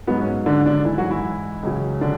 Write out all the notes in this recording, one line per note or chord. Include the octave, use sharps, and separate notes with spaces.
G#2 F#3 B3
C#4
D3 D4
D3 D4
G#2 E3 E4
F#3 F#4
E3 E4
C#2 C#3 F#3
D3 D4